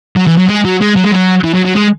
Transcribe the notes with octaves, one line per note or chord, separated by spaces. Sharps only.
F#3
E3
F#3
G#3
F#3
G#3
F#3
G#3
F#3
E3
F#3
F#3
G#3